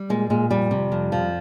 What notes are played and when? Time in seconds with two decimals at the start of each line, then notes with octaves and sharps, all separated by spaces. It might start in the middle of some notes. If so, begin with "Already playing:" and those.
Already playing: G3
0.10 A#2 G#3
0.30 A#2 G#3
0.50 F2 G3
0.71 C3
0.92 F2
1.12 F3